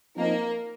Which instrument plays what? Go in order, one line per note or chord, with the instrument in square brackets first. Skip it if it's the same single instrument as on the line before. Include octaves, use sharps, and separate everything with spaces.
[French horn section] F3 C4 D#4 [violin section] A#3 A#4